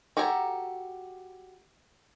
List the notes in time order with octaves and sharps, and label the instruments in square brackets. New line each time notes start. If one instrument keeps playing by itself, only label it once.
[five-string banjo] F#4 G4 A4 G#5 A#5